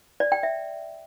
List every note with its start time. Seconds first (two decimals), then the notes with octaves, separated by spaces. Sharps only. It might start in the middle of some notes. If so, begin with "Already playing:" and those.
0.20 D5
0.32 G5
0.43 E5